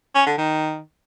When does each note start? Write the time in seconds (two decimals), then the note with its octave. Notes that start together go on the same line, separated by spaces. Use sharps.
0.15 C#4
0.27 D3
0.38 D#3